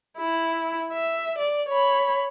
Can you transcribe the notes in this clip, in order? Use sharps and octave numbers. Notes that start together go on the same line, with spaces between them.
E4
E5
D5
C#5 B5